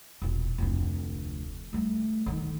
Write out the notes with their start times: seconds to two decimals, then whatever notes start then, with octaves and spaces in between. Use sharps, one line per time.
0.22 E1 A#1
0.58 F1 D2
1.73 G3 A3
2.26 D3 D#3